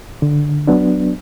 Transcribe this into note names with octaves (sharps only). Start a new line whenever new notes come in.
D3
F#3 B3 D4